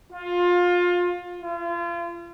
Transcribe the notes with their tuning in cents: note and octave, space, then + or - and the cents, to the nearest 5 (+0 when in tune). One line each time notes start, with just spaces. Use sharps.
F4 +20
F4 -35